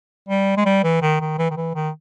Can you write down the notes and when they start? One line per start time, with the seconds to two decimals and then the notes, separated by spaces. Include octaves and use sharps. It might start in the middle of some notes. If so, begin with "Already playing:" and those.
0.29 G3
0.57 G#3
0.66 G3
0.83 E3
1.02 D#3
1.21 D#3
1.39 E3
1.51 D#3
1.57 E3
1.75 D#3